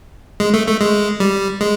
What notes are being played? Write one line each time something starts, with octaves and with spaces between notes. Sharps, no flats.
G#3
A3
A3
G#3
G3
G#3